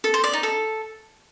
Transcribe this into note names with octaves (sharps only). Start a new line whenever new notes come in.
A4
C5
D5
D#4
A4